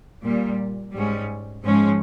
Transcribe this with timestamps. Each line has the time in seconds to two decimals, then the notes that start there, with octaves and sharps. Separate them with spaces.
0.23 A#2 G3 A#3
0.94 G#2 G3 C#4
1.64 G#2 F3 G#3 C#4